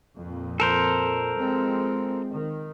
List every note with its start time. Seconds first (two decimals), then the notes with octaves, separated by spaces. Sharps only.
0.17 F2 A#2
0.60 A4 A#4 C5
1.38 F3 G#3 C4
2.31 D#3